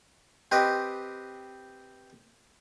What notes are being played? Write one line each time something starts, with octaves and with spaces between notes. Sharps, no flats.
C4 G4 B4 D#5